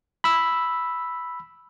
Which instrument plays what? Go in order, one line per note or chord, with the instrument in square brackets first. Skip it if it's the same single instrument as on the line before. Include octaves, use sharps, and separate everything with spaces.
[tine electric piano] B5 E6